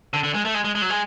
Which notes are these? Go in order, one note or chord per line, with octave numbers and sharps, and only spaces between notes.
D3
D3
G#3
A3
G#3
G#3
G#3
F#3
G#3